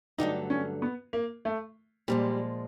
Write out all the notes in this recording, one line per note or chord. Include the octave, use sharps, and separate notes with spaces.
G2 D3 F#3 A3 D#4
C#4
B3
A#3
A3
A#2 F3 G3 G#3